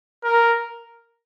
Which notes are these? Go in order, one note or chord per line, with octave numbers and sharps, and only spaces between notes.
A#4